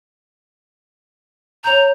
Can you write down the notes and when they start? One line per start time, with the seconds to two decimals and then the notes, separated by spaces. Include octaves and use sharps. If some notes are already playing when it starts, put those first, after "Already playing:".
1.64 C#5 A#5 G6